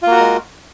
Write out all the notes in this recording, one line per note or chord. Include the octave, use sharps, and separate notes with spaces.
G#3 A#3 F4 F#4 A#4